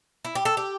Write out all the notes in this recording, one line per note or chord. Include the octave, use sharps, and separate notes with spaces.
E4
G4
A4
G4